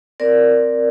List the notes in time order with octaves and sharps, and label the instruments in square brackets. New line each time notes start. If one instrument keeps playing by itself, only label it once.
[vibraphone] C4 A#4 D5
C4